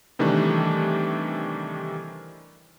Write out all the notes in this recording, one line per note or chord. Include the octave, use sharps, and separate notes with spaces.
C3 D#3 E3 G3 A3 D4